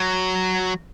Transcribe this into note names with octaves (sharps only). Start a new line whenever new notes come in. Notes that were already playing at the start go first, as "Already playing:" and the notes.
Already playing: F#3